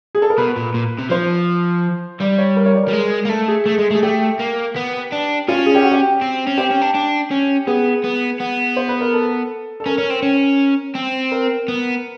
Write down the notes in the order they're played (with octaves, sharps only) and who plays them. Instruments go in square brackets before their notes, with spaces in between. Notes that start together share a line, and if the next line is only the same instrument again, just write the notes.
[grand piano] G#4
A4
A#4
[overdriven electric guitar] B2 [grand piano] B4
[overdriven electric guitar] A#2
A#2
C3
[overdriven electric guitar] F3 [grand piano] C5
[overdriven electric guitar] G3 [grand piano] D5
[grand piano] C#5
A#4
C#5
D5
A#4
[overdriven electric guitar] G3
G#3
A#3
[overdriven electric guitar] A3 [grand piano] A4
[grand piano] G#4
[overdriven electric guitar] A3
G#3
A3
[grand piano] G#4
[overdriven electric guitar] A3 [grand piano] G4
[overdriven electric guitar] A#3
B3
D4
[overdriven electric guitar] C#4 [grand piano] F4
[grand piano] G#4
G4
F#4
G4
[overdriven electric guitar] C4
C#4
[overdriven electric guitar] C4 [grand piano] G4
[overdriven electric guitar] C#4
D4
D4
C#4
[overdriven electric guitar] B3 [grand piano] G#4
[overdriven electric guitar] B3
B3
[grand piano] C5
B4
A#4
A4
A4
[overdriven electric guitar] C#4 [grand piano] A#4
[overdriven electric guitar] C#4
C4
C#4
C4
[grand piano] A#4
[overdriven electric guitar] B3